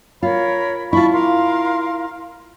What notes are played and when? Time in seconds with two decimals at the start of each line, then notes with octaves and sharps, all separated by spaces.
0.23 F4 A#4 C#5 B5
0.93 E4 F4 A5 B5 C#6
1.12 A#4 F5 C6